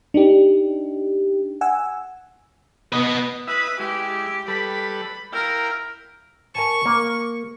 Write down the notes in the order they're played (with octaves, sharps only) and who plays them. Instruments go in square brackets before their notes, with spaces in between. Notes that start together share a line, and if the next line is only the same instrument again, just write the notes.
[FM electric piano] D4 D#4 G4
F#5 G#5 E6
[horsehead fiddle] B3 [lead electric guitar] B4 D#5
[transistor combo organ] E4 D#5 E5 [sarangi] B4
[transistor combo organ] G#3 E4 [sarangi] G4
[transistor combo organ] G3 A4 B4 [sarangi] B5
[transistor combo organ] E4 F5 G5 [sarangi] A#4
[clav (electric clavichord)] A#4 G#5 A5 [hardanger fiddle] C#6
[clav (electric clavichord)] A#3